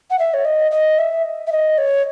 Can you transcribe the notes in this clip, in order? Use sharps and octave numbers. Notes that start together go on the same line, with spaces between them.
F#5
E5
C#5
D#5
D#5
E5
E5
D#5
C#5